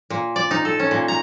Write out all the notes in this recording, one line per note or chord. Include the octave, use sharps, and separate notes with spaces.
A#2
D5
D#4
A4
C#4
A#2
A#5